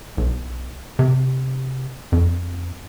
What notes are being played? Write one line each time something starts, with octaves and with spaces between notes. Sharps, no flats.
B1
C3
F2